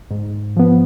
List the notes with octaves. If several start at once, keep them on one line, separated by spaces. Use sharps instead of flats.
G#2
F3 B3